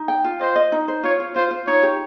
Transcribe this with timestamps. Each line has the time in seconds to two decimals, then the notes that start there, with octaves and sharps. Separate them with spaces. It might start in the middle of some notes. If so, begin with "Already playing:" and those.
Already playing: D#4
0.08 G5
0.24 F4
0.41 C5 D#5
0.56 D#5
0.72 D#4
0.88 C5
1.04 F4 C#5
1.20 F4
1.35 F4 C5
1.51 F4
1.67 D#4 C#5
1.83 G4